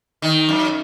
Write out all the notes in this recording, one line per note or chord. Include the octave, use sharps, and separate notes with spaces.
D#3
F#2